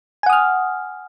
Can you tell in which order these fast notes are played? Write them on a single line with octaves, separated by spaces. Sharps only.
G#5 F#5 D#6 F6